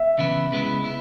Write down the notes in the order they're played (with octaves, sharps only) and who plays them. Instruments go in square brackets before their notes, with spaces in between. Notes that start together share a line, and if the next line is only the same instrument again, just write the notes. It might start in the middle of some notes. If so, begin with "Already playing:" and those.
Already playing: [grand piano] E5
[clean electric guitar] C#3 E3 B3 E4
C#3 G#3 B3 E4
B3 E4